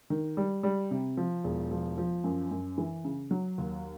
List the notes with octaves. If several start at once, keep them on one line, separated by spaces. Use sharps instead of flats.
D#3
G3
G3
C3
F3
E1
F3
F3
F#2
F#2
E3
C#3
F#3
D#2